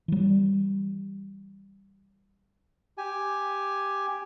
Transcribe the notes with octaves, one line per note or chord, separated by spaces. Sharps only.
E3 G3
G4 G#5